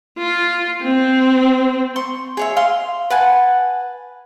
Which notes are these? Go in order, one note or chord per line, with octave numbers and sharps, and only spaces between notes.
F4
C4
C6 C#6
G#4 C#5 E5
F5 C6 D#6
B4 F#5 G#5 A5